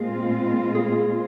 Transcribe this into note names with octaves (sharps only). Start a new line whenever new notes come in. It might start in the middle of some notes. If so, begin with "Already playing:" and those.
Already playing: A#2 G#3 C4 F4 G#4
G#4